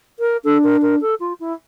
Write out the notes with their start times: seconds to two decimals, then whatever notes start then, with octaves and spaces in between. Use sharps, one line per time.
0.19 A#4
0.44 D4 A4
0.64 A#4
0.82 A#4
1.01 A4
1.20 F4
1.40 E4